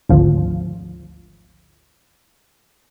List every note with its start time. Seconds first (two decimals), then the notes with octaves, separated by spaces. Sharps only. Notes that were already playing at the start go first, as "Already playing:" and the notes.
0.09 G#1 D2 F3